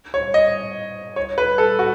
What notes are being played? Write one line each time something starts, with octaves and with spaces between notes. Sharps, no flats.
C#5
D#5
C#5
B4
A4
F#4